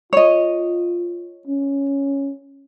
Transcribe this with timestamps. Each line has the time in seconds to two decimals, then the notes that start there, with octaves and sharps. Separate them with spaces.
0.13 F4 C#5 D#5
1.48 C#4